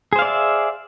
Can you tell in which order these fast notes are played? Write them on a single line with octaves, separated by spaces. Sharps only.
G#4 C5 F5 D5 E5